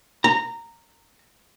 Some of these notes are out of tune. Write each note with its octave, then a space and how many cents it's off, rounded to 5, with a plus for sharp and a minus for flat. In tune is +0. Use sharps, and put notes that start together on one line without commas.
A#5 -15